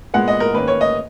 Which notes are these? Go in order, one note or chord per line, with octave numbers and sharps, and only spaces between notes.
A#2 G#3 B3 F#5
D#5
A#4
D#3 A#3 C#4 B4
C#5
D#5